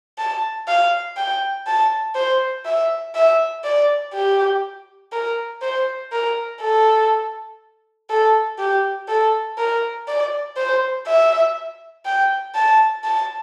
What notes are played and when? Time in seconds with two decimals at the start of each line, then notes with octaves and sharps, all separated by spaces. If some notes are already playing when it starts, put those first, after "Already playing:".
0.18 A5
0.68 F5
1.17 G5
1.67 A5
2.15 C5
2.65 E5
3.15 E5
3.64 D5
4.14 G4
5.12 A#4
5.62 C5
6.12 A#4
6.61 A4
8.10 A4
8.59 G4
9.08 A4
9.58 A#4
10.08 D5
10.57 C5
11.07 E5
12.05 G5
12.55 A5
13.04 A5